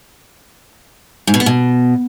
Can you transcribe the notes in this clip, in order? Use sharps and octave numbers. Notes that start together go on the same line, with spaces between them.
G#2
B2
B3
B2